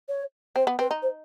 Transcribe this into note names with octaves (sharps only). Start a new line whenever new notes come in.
C#5
C4 C5
B3
C4 B4
D#4
C5